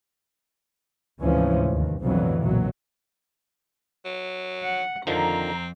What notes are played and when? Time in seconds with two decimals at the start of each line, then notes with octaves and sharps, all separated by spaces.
1.20 D2 G#2 C3 E3 F3 C#4
1.71 D#2
2.02 B1 F2 A2 D3 E3 F#3
2.40 B1 A#2 F#3
4.05 F#3
4.62 F#5
5.07 F2 D3 D#3 F3 C4 A#5